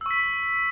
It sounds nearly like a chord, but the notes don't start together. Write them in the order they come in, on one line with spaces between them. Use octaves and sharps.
E6 C#6 B6